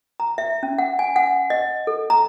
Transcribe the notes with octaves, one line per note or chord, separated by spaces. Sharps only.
A#5
E5
C#4
F#5
G#5
F#5
D#5
A4
A#5